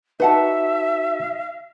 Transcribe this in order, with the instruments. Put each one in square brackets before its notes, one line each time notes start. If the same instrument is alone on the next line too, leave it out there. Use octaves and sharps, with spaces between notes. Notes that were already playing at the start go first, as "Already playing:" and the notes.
[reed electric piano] D#4 F#4 [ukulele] B4 F#5 A5 [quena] E5